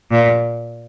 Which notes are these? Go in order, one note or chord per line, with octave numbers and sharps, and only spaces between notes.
A#2